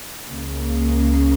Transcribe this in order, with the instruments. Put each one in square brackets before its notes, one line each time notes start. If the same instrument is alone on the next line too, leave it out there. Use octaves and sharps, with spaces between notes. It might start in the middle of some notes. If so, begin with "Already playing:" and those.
[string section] C#2 C#3 A#3